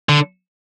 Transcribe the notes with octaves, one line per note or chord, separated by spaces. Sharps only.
D3